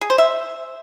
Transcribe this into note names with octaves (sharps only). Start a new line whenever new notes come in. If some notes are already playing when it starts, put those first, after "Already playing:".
G#4
C5
E5